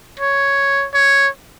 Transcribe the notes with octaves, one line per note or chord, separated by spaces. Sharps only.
C#5
C#5